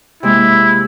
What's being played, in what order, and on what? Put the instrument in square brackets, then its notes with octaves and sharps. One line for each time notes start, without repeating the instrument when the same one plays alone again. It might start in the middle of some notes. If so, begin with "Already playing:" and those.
[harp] C3 G#3 A#3 [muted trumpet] E4